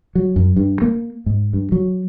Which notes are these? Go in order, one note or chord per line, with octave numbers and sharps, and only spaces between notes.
F#3
F#2
G2
A#3
G#2
G2
F#3